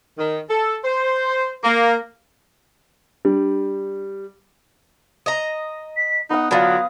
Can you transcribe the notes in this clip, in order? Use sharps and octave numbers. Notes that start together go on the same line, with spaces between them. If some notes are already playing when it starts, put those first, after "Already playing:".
D#3
A4
C5
A#3
G3 D4
D#5 A#5
B6
B3 D#4 F#5 D#6
D3 F#3 F4 B4 F5